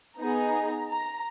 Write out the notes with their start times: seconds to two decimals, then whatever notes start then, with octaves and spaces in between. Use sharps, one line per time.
0.19 B3 D#4 G#4 A#5
0.89 A#5